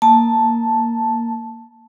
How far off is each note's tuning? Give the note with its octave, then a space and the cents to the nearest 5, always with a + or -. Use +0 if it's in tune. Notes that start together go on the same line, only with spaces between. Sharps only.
A#3 +0 A5 +0